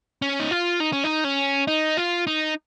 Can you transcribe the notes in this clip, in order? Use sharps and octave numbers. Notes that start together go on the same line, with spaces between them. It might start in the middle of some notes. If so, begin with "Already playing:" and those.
C#4
D#4
F4
D#4
C#4
D#4
C#4
D#4
F4
D#4